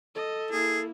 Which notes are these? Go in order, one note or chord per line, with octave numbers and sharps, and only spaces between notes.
A4 D#5
A#3 E4 G#4